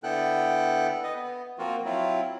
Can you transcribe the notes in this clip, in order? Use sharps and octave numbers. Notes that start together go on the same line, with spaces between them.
D3 B3 E4 A4 G5 F#6
B4 D#5
B3
F3 A#3 C4 F4 F#4
F#3 C4 E4 F4